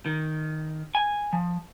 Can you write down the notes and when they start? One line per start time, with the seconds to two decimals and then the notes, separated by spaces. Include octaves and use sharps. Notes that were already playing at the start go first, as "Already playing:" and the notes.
0.06 D#3
0.95 G#5
1.33 F3